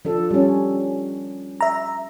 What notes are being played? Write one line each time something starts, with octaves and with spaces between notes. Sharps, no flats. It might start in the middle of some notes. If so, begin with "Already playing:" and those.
F3 D4 A4
G3 C#4
E5 A#5